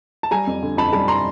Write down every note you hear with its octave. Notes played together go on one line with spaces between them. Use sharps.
A5
G3 G#5 A#5
F2
D3
F2 A5 B5
G3 A5 B5
A#5 C6